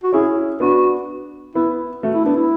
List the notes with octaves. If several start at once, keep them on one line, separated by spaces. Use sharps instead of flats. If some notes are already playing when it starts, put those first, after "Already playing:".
F#4
C#4 E4 G#4
B3 D4 F#4
B3 E4
A3 F#4
E4
B3 D4
E4